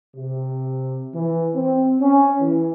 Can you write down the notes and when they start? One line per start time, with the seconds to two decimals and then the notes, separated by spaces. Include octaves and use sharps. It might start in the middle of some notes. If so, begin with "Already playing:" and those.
0.16 C3
1.14 E3
1.55 C4
2.00 C#4
2.40 E3